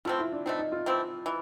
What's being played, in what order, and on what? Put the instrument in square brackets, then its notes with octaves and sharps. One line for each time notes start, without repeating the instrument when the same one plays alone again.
[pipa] E3 A3 C4 [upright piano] F4
[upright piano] E4
D4
[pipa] E3 A3 C4 [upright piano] D#4
[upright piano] D#4
F4
[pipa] E3 A3 C4
E3